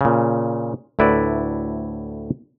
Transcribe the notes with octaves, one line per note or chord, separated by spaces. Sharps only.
A#2 C#3
D2 A2 E4 B4 D5